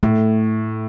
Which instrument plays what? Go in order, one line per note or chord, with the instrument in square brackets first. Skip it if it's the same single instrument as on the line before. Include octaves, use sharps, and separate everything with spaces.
[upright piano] A2 [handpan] A3